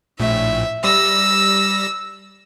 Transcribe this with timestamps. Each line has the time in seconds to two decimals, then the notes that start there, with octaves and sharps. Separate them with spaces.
0.20 A#1 A2 E5
0.84 G3 E6 A#6